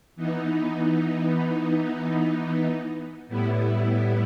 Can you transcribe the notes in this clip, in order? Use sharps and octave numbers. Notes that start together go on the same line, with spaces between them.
E3 B3 D#4
A2 G3 B3 E4